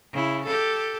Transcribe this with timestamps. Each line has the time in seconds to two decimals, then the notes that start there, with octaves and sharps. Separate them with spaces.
0.13 C#3 E4
0.46 G4 A4